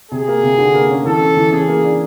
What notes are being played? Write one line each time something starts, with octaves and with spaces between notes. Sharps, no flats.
C3 G#4
A#3
C3
D3
A#3
C#4
E3 A4
C#4
E3
C#3 G#4
A#3
D4